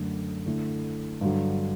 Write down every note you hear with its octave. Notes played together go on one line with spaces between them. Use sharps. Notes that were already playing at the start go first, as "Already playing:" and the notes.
Already playing: F#2 D3 A3
D3 A3 E4
G2 D3 F#3